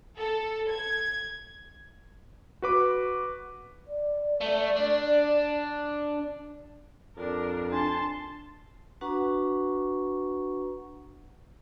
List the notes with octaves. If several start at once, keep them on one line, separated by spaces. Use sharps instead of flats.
A4
G#6
F#4 B4 D6
D5
A3
D4
F2 D4 A#4
D4 A5 C6
D4 F#4 B4 F#5 A#5 C#6